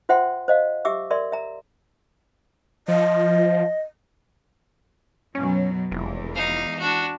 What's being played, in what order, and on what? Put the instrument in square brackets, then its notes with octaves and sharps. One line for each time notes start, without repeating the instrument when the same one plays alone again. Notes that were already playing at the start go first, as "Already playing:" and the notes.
[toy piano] F4 C5 E5 F#5 G5 C6
C5 D#5 F5
G4 E5 D6 E6
A#4 D5 E5 C6
E5 A#5
[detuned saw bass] F3 [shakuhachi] D#5
[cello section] F#2 B2 F#3 [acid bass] C#4
[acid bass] F1 [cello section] E2 E3 G#3
[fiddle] D#4 F5
D4 F#4